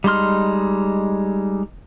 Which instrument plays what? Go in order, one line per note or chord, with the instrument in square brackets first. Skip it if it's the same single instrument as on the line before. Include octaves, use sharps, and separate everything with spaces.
[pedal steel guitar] G3 G#3 D#4 C6 F6